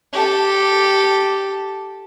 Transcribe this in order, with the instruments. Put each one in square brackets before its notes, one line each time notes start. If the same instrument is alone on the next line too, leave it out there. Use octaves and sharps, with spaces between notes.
[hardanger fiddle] G4 A4